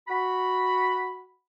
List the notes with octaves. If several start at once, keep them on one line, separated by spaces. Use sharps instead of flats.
F#4 B5